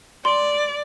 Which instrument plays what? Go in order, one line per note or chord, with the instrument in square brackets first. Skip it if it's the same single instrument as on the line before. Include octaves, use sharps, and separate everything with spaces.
[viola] D5 [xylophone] C6